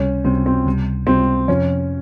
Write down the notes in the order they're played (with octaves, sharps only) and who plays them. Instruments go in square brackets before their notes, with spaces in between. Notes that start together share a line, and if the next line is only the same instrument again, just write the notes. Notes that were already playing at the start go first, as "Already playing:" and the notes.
Already playing: [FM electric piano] C#2 C3 G3 [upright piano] C#4
[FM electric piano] C#2 C3 G3 [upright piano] C4
[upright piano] C4
[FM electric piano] C#2 C3 G3
[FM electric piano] C#2 C3 G3 [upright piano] C4
[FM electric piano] F2 C3 F3 [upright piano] C#4